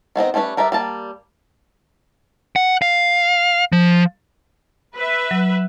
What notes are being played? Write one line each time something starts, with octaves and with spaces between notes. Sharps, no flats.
D#3 B3 C4 D#5
G3 A3 C#4 E4 B4
G3 A#4 B4 D5 E5
G3 A#3 A5
F#5
F5
F3
B4 E5
F#3